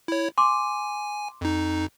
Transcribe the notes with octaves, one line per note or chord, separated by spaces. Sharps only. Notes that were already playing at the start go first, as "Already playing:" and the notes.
E4 C#5
G#5 C6 D6
F2 D#4